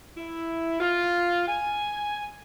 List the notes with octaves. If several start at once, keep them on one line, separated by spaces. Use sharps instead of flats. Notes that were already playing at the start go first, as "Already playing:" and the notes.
E4
F4
G#5